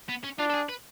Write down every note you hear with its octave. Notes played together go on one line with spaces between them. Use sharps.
B3
C#4
D4 F4
A4
G#4
B4